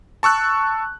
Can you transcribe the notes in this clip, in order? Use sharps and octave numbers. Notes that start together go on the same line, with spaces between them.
A5 C#6 E6 F#6